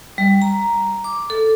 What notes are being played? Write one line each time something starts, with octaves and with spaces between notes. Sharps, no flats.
G3
A#5
D6
A4